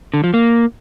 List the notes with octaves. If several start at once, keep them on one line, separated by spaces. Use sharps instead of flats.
D3
F3
A#3